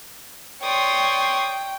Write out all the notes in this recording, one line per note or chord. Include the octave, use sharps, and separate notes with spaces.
C#5 D5 G5 C6 D#6